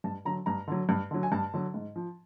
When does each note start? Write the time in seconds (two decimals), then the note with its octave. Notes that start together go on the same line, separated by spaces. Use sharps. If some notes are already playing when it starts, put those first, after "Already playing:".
0.04 G2 A5
0.25 D3 F#3 A#5
0.46 G2 A#5
0.68 D3 F#3
0.89 G2
1.11 D3 F#3
1.23 G#5
1.32 G2 A5
1.54 D3 F#3
1.74 G#2
1.96 F3